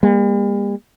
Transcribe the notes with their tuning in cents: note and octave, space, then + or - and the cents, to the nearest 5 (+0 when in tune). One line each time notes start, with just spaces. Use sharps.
G3 +45 A#3 +20